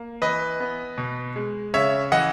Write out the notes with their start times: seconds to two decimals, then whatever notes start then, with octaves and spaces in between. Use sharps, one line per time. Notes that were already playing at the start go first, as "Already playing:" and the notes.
Already playing: A#3
0.22 E3 B4 D#5
0.60 B3
0.98 B2
1.36 G#3
1.74 C#3 C#5 E5
2.12 E3 D#5 F#5